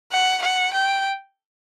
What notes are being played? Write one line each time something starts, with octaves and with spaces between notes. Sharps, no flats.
F#5
F#5
G5